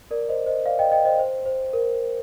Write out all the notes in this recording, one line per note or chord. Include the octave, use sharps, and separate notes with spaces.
A#4 D5
C5 D#5
C5 D#5
D5 F5
D#5 G5
D#5 G5
C5 D#5
C5
C5
A#4